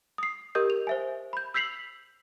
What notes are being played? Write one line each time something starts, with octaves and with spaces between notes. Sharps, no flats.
D#6 C7
G4 A#4 D#5 D#6 G6
F7
C5 E5 G#5
B5 G6
E6 G6 B6 C7 F7 F#7